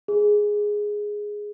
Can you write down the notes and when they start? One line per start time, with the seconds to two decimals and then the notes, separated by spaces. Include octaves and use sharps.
0.08 G#4